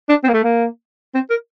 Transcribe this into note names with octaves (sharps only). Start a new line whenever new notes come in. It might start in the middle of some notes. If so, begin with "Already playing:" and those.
D4
C4
A#3
A3
A#3
C4
A#4